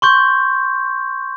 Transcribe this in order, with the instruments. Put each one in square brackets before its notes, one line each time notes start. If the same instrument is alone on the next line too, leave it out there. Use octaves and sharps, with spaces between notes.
[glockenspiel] C6 C#6 G6